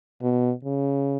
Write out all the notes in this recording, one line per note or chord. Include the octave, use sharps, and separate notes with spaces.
B2
C#3